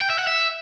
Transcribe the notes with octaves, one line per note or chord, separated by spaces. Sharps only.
G5
E5
F#5
E5